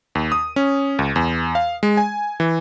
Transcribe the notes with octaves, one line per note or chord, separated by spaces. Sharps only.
D#2
D#6
C#4
C#2
E2
F5
G#3
G#5
E3